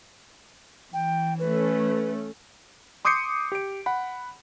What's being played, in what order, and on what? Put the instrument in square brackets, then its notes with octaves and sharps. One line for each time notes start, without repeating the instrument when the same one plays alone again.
[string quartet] E3 [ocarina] G5
[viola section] A3 C#4 [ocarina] B4
[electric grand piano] C6 D6 D#6 G6 C7 C#7
G4 D7
F#5 B5